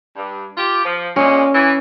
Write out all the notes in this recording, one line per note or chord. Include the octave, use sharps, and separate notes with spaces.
G2
F4 G4
F3
A#2 G#3 C#4
E3